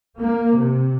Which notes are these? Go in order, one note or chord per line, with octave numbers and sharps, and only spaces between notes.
A#3
C3